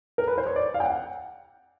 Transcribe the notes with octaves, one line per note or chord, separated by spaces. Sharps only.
A#4
B4
C5
C#5
D5
F5
G5
F#5